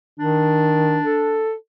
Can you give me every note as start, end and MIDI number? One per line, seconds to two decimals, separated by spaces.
0.19 0.99 51
0.19 1.46 62
1.04 1.54 69